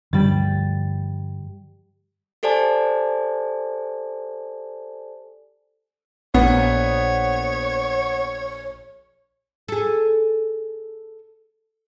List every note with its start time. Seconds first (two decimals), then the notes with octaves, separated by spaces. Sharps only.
0.13 G2 D3 F3 G3 A6
2.43 G4 A4 C5 D5 G#5 A5
6.34 A#1 B3 C#5
9.68 G#4 A4